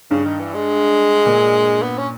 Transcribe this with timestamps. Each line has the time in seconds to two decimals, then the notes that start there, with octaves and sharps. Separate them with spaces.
0.11 G2 C#3
0.25 D#3
0.40 E3
0.54 G#3
1.26 A#2
1.82 B3
1.98 C#4